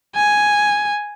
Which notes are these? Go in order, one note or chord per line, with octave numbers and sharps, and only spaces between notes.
G#5